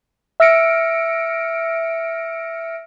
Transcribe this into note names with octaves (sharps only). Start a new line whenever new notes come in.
E5 E6 F6 A#6 C#7 D7